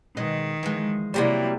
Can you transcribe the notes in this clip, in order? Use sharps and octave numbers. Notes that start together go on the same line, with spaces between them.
B2 D#3 G#3 D#5
E3 F3 G#3
C3 F#3 G3 A#3 E4